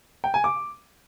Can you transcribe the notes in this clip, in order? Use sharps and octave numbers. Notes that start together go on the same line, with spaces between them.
G5
G#5
D6